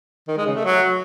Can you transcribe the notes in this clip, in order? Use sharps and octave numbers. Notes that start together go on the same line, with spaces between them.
D#3
G#3
C#3
A3
F#3